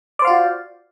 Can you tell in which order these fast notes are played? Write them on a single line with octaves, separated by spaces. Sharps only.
D5 C5 F5 F4 F#4